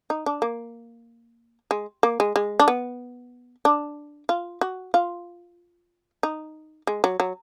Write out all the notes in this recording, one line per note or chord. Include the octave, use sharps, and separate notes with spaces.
D#4
D4
A#3
G#3
A#3
G#3
G#3
D4
B3
D4
F4
F#4
F4
D#4
G#3
F#3
F#3